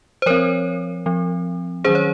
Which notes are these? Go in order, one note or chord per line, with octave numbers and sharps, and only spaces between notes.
C5
F3 C4 A#4 C#5
F3 C4
D#3 F#3 C#4 G#4 C5
C#5